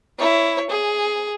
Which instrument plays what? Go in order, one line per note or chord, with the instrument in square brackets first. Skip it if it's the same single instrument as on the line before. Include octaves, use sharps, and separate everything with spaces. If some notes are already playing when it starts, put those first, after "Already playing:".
[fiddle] E4 C#5
G#4